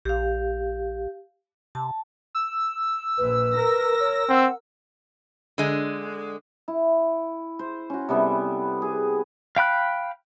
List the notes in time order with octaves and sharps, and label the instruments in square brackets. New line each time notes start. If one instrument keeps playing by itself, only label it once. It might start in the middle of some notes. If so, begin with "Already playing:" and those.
[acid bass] A#1 [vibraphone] G4 F5
[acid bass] C3 [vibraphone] A5
[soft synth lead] E6
[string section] A#1 [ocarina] B4
[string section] A#4 A#6
[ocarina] C#5
[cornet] C4 [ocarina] F#5
[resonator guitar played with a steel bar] D3 G#3
[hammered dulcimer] E4
C5
C#4 F#4
C3 G3 B3 A4
G#4
[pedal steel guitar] F5 G5 B5 F#6